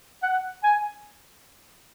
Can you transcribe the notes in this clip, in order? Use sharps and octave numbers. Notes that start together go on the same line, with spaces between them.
F#5
G#5